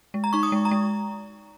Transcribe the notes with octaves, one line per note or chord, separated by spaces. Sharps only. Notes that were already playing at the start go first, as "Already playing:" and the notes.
G#3
A#5
D#4 C#6
D#6
G#3
A#5
G#3